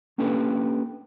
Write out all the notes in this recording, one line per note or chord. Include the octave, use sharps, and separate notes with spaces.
A#3 C#4 D4 G4 A4 B4